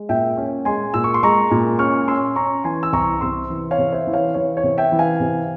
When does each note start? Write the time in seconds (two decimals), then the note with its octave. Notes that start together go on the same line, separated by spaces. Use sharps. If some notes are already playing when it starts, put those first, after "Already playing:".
Already playing: G#3
0.09 A#2 E5 G5
0.37 C#4
0.65 G#3 G#5 C6
0.94 A#2 E6
1.04 C#6
1.14 C6
1.23 G#3 A#5 C#6
1.51 A#2
1.79 C#4 C#6 F6
2.08 C#4 C6 E6
2.36 C#4 A#5 C#6
2.64 E3 G#5 C6
2.83 E6
2.93 C2 A#5 C#6
3.21 C3 C6 E6
3.50 E3
3.71 C#5 F5
3.78 C3
3.92 C5 E5
4.07 E3
4.13 C#5 F5
4.34 E3 C#5
4.57 C#5
4.63 C3
4.78 E5 G5
4.92 E3
4.99 F5 G#5
5.20 C3